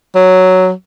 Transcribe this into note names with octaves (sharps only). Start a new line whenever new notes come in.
F#3